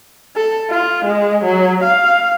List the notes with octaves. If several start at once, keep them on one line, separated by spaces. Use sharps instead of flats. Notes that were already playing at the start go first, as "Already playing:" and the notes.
A4
F4
G#3
F#3
F5